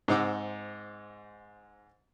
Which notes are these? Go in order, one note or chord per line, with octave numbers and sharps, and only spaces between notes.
G#2 C4 D#4 F#5 D6 E6